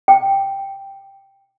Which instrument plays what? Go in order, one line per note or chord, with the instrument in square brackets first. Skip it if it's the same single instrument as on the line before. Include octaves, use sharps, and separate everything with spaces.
[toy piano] G5